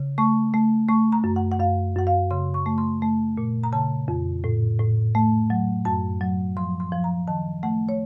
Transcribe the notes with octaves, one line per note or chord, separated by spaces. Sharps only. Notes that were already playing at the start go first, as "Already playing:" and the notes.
Already playing: C#3
A3 C#6
A3
A3 C#6
A#5
F#2
F#5
F#5
F#2 F5
F#2 F#5
F5
C#3 C6
C#6
A3
C6
A3
A#2
A#5
C#3 A5
F2
A2
A2
A3
F#3
F#2 A5
F#3
F3 C6
C6
F3
A#5
D#3 A5
A3 F#5
C#5